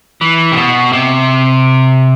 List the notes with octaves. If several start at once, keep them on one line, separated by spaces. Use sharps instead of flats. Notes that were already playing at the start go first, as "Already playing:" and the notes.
E3
C3
B2
C3